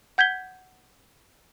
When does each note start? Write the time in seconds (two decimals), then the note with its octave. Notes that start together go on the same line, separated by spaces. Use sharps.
0.18 F#5 G6 G#6 B6 G7